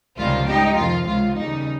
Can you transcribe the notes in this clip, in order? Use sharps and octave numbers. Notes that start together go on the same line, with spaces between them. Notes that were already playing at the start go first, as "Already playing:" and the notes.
C#2 C3 D#3 G3 F4
G#2 G3 D#4 G4
F2 C3 D#3 F4
C#2 C3 D#3 F4
D#2 C#3 G3 D#4